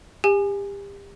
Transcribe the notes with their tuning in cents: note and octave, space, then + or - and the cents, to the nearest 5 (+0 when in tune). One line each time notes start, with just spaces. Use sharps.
G4 +30 G#5 +0